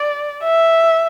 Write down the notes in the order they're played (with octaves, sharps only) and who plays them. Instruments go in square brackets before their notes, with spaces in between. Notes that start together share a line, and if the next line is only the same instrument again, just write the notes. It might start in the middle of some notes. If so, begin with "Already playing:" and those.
Already playing: [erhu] D5
E5